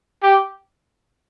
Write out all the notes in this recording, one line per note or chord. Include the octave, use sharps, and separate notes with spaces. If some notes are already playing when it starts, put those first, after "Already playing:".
G4